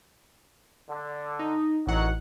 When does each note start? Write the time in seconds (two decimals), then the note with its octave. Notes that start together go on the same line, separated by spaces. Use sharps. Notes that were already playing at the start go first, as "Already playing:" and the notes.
0.89 D3
1.39 D#4
1.87 A1 D#3 F#3 F#5